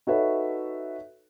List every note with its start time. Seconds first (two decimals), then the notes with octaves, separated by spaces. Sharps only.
0.07 D#4 F#4 A4 B4 C#5 E5